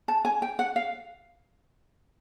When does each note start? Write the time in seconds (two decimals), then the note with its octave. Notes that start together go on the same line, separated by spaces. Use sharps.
0.08 A5
0.25 G#5
0.42 G5
0.59 F#5
0.76 F5